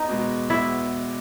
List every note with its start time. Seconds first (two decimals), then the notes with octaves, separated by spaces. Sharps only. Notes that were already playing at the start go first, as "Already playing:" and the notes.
Already playing: E2 D#4
0.09 B2 G#3
0.50 E2 E4